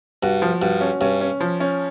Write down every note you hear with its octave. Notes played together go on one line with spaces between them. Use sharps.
G2 F#4
F3
G2 F#4
C#4
G2 C#4
C#4
F3
C#4